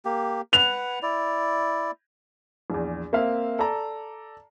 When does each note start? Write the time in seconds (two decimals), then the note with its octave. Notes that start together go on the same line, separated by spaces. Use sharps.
0.05 A#3 G4
0.53 B4 F#5 F7
1.02 E4 D5
2.70 A#1 E2
3.13 A#3 C4 E5 F5
3.59 A4 D5 A#5